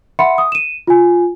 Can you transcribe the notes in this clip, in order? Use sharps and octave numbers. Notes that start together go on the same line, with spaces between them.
E5 F#5 B5 C6 C#7
D#6
D#7 E7
F4 G#5